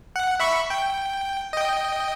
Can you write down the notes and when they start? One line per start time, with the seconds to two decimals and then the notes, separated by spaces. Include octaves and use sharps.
0.16 F#5
0.40 E5 B5 C#6
0.70 G5
1.53 D#5 G5